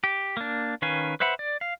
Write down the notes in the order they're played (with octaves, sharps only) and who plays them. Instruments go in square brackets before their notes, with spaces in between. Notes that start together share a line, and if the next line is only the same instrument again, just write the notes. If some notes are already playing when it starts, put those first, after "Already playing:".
[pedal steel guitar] G4
A#3 D4
D#3 C#4 B4 F5 G#5
B4 C5 E5 F#5 B5
D5
F5